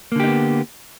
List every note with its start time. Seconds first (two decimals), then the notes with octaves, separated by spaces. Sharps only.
0.12 A#3
0.16 D3
0.20 G4
0.24 D#4
0.28 B3